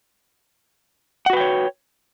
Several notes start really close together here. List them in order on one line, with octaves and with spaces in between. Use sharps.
F#5 F#4 B4 G5 C#5